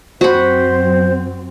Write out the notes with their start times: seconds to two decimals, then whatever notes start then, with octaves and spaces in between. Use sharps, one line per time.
0.21 F#2 F#3 C4 F#4 C5 B5